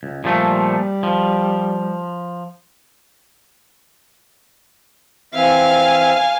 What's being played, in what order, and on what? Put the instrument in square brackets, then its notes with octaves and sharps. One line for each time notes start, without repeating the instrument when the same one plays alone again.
[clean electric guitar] C#2
[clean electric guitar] A#2 F3 A3 [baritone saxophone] G3
[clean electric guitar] F3
[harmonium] E3 C4 E5 [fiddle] F5 G#5